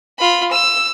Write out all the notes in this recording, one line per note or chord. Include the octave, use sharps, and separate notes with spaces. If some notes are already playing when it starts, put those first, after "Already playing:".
F4 B5
E6